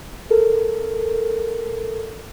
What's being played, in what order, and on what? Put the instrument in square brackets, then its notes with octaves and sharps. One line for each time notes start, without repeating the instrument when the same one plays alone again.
[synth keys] A4 A#4